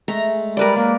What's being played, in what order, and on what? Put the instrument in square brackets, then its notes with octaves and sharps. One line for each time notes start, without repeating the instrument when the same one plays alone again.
[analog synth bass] G#3 [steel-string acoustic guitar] A3 [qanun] A#5
[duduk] G3 [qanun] A#4 B4 D5
[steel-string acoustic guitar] G2 F#3 [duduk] A#3